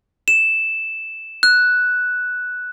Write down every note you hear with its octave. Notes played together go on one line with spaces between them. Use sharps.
E7
F#6